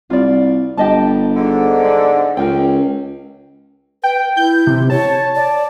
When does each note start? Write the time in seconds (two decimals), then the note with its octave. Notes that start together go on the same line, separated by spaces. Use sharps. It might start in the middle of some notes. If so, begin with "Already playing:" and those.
0.10 C2 F4 D5
0.78 G1 G4 D#5 A5
1.36 G#2 D3
1.85 D4
2.37 C#2 A#4 G5
4.04 B4 G5
4.37 E4 G6
4.67 C3
4.90 C#5 A5
5.35 D5